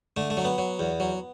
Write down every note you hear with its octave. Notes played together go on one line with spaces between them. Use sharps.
D3 A3
A3
F#3
B3
F#3
E2
F#3